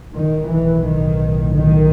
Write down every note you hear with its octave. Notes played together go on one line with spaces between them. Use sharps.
B1 A2 D#3
E3
D#3
D#3